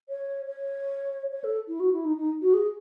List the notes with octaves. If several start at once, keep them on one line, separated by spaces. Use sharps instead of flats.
C#5
C#5
C#5
A4
E4
F#4
E4
D#4
D#4
F#4
G#4